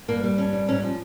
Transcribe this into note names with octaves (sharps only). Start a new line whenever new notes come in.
G2 A#3
G3
G2 C#4
G3
G#2 C#4
F3